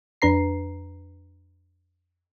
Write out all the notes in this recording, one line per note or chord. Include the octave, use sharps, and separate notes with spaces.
F2 D4 B4 A#5 C7